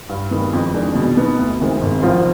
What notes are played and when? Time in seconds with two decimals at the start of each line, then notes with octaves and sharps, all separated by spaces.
0.09 G2
0.31 D#3 G#3 B3
0.53 F2
0.74 D#3 G#3 D4
0.95 B2
1.17 B3 D#4
1.38 D2
1.59 C3 D#3 G#3 C4
1.81 G#1
2.02 G#2 F3 C4 F4